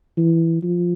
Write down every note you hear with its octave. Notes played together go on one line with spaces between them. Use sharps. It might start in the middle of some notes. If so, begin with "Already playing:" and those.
E3
F3